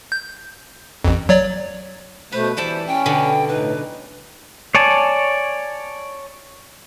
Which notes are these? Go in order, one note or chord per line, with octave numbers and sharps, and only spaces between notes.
G6
A1 F2
F#3 C#5 D5
B2 A3 B4 C5
E3 G3 E4 C5 A5
C#4 G5
B2 D3 B3
A2 D#4 B4
C#5 D5 G#5 A5